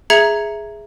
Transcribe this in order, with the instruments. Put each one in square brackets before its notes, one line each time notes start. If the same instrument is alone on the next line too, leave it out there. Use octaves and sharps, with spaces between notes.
[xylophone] G#4 E5 A#5 G#6 C#7 F7